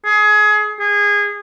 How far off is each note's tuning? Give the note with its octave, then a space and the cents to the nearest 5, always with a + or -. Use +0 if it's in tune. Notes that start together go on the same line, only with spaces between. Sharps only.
G#4 +25
G#4 -20